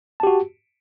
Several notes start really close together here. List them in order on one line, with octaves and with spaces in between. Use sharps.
A5 G4 F#4